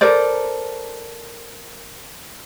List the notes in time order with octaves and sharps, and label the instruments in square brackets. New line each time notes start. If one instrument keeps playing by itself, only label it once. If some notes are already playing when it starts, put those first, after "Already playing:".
[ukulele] A4 A#4 C5 D5